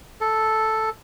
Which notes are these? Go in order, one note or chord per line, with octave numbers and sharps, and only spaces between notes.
A4